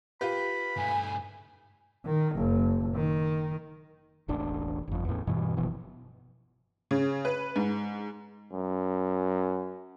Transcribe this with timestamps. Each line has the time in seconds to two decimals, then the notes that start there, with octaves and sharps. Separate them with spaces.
0.21 F4 G4 B4 B5
0.77 G2 A3 G#5
2.06 D#3
2.35 F#1
2.95 D#3
4.28 E1 A1 D4
4.88 G1 F2
5.05 E2 A2
5.27 G2 B2 E3
5.57 F#1 B2 E3 F3
6.91 C#3
7.25 B4
7.56 G#2
8.53 F#2